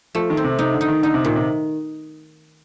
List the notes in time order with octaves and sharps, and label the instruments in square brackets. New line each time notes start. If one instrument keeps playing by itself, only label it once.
[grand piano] F3 [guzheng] A3
[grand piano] D#3
[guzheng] C4
[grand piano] C3
[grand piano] C3 [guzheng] D#4
[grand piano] D3
[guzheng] D#4
[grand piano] D#3
[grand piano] D3 [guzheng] D#4
[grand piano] C3
[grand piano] A#2 [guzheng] D#3
[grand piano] C3